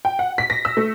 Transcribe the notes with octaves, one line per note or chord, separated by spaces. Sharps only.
G5
F#5
B6
A#6
E6
A3